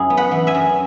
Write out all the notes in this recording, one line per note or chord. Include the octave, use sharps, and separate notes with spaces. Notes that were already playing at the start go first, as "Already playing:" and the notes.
Already playing: F#2 E4 G#4
B3
F#5 B5
E3
E5 G#5
F#2